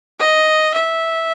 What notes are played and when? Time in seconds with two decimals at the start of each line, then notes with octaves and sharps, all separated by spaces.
0.19 D#5
0.74 E5